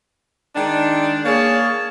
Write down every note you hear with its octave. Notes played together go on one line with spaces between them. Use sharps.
D#3 G#3 D4
A#3 G#4 C#5 F5 A5